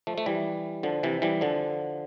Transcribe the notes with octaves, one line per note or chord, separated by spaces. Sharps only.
F3 A3
A3
E3 G3
D3 F3
C3 E3
E3 G3
D3 F3